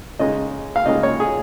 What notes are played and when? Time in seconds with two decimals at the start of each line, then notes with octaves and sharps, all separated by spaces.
0.19 C#3 G#3 D#4 D#5
0.76 F5
0.86 C#3 G#3 D#4 D#5
1.03 C#5
1.20 G#4